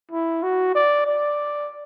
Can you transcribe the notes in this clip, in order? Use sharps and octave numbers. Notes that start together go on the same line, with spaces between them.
E4
F#4
D5
D5